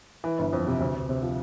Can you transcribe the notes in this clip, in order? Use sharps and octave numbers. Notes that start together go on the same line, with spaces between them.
E3
G1
F2
C3
D2 C4
D2
C3
F3